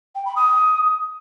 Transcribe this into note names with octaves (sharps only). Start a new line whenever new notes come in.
G5
B5
D#6